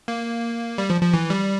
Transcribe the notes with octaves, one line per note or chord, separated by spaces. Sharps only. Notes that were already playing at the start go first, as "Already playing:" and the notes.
A#3
G3
F3
F3
E3
G3